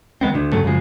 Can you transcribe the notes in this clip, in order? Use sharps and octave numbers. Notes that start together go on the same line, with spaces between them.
D#3 G#3 B3 C4
D2 D3
G2 C#3 F#3 A3
F#2 C#3 F3 G#3